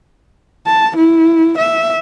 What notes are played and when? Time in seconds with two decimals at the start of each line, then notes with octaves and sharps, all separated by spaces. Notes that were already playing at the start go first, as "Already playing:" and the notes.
0.66 A5
0.97 E4
1.58 E5